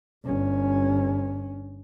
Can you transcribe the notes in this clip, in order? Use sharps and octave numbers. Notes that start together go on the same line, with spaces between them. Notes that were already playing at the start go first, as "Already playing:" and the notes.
G1 C#4